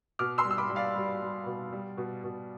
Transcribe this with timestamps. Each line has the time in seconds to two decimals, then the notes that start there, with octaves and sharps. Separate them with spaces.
0.19 B2 D6 F6
0.38 C6 E6
0.45 G3
0.51 E6
0.58 B5 D6
0.70 G3
0.76 D5 F5
0.96 G3
1.22 G3
1.46 B2
1.72 G3
1.97 B2
2.24 B2